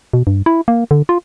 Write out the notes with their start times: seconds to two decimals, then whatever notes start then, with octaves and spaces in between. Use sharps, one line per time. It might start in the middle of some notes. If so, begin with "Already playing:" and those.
0.13 B2
0.27 G2
0.46 E4
0.68 A#3
0.91 D3
1.09 F4